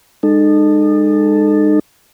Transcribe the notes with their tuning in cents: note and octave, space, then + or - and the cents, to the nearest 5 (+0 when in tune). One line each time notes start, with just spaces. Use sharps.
G#3 -30 D#4 -35 A4 +0